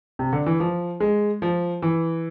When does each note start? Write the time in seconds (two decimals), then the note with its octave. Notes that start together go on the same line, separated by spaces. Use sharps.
0.19 C3
0.33 D3
0.46 E3
0.60 F3
1.00 G#3
1.42 F3
1.82 E3